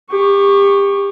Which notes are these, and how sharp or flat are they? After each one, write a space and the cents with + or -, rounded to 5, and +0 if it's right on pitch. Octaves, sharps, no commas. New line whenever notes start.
G4 +30 C#6 +0